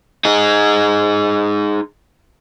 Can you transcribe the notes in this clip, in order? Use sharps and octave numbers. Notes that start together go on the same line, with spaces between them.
D#4 G#4